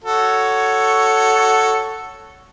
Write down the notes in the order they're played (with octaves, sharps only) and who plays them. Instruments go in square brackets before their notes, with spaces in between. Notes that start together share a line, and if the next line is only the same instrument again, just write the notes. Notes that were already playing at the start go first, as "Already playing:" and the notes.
[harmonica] F#4 A4 C#5